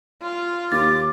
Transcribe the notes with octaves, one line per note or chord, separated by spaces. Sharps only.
F4
D#2 D6 A6